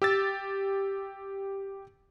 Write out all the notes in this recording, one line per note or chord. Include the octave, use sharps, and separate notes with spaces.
G4 E6 A6